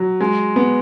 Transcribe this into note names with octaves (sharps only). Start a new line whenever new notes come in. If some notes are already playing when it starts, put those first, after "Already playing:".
Already playing: F#3
G#3
B3